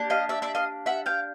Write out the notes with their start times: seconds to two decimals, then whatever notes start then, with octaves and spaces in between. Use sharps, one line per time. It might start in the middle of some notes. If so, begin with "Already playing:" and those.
Already playing: A#3 D4 G4
0.10 D#5 F5
0.29 D5 E5
0.42 D5 E5
0.55 D#5 F5
0.86 E5 F#5
1.06 F5 G5